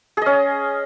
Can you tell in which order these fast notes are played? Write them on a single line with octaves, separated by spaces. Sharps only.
G#4 D#5 C#4